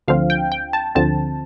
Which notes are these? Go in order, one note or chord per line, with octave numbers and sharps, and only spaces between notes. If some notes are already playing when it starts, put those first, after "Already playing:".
D2 D3 F3 C4 F5
G5
G5
A5
D2 D3 F3 C4 A5